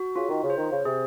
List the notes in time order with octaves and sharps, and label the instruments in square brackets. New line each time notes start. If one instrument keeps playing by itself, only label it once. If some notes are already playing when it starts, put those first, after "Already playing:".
Already playing: [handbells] F#4
[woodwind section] C#3 [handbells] F4
[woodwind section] D#3
C#3
[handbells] C5
[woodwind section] D#3
C#3
[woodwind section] C3 [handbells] G#4